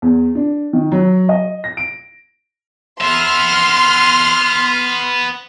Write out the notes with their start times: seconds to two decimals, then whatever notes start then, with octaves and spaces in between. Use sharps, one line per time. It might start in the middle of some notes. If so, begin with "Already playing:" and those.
0.02 E2
0.35 D4
0.73 D#3
0.92 F#3
1.29 D#5
1.64 A#6
1.77 D7
3.01 B3 E5 C6 F6